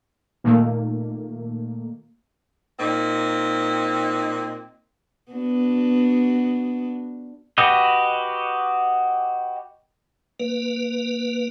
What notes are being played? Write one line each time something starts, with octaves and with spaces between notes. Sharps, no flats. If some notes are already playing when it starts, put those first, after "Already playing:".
A#2 D#3 A3 A#3
A#2 C4 D#4
B3 D4 F#4
F#4 G4 B4 D#5
A#3 B4